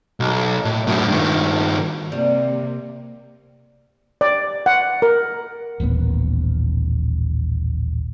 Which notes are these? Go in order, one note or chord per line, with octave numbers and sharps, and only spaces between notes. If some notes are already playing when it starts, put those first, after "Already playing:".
B1
A2
F#2 A2
G2 D#3
C3 G3 A#3
D5
F#5
A#4
D#1 A1 D#2 B3